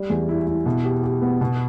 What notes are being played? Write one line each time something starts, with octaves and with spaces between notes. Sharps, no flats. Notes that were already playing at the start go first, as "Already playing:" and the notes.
Already playing: G3
E2
E4
E4
B2
G4
G4
B3
B2